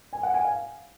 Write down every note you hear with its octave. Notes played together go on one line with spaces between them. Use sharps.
G#5
F#5
G#5
F5